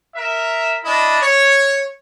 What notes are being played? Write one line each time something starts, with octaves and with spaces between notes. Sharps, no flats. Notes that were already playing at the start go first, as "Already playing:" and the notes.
A#4 E5
D4 E4 D#5
C#5